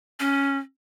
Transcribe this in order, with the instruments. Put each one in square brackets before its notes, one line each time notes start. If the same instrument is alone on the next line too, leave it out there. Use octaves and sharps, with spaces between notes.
[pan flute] C#4